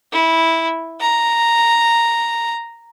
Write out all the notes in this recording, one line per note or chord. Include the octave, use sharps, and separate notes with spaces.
E4
A#5